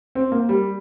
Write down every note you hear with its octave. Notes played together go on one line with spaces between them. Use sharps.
C4
A#3
G3